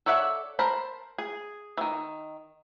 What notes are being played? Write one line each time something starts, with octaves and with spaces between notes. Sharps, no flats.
A4 C#5 D5 E5 F#5
A#4 C5 A5 B5
G#4
D#3 E3